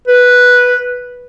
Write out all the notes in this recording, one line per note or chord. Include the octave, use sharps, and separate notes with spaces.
B4